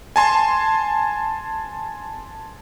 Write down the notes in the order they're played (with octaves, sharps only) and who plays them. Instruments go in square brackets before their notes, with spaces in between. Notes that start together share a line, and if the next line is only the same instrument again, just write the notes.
[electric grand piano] G#5 A5 C6